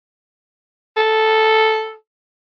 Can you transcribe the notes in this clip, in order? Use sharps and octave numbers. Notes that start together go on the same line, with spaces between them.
A4